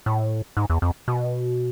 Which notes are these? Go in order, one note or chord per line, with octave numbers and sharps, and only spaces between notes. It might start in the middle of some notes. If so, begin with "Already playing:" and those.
A2
G#2
E2
F2
B2